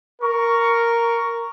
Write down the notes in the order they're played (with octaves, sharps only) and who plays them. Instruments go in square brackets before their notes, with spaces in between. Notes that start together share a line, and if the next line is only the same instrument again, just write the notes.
[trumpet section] A#4 C#6